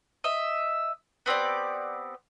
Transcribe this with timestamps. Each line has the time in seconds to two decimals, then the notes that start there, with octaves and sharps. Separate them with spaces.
0.24 D#5 E5
1.26 B3 C4 G4 D5